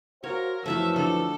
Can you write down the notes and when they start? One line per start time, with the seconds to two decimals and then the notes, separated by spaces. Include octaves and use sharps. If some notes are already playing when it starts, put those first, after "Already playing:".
0.24 F#4 A#4 C5 C#5 F5
0.66 F#2 E3 F3 A3 F#4 E5 F5
0.96 D3 A4